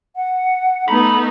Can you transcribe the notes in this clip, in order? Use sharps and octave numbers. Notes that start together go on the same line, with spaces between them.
F#5
A3 B3 D#4 A#5 B5